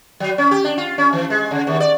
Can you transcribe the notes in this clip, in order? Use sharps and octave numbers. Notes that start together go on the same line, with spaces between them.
F#3
C#4
G4
D4
F4
C#4
E3
G#3
C#3
D#2
D5